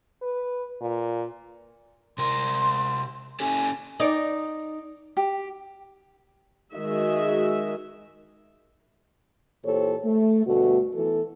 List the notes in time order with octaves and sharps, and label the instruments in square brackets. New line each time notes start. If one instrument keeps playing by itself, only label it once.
[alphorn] B4
A#2
[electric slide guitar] C3 A#4 [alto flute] C6
[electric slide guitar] C#4 G4 A4 [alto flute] G#5
[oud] D#4 D5
[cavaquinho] G4
[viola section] D#3 G#3 F#4 G#4 D#5 E5
[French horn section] A#2 E3 G4 A4 C5 C#5
A3
D2 G2 B2 A3 F#4
E3 A3 B3 A4